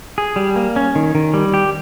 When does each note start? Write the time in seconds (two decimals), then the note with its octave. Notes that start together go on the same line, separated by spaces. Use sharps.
0.18 G#4
0.36 G3
0.56 A#3
0.76 C#4
0.95 D#3
1.15 D#3
1.34 G3
1.54 G4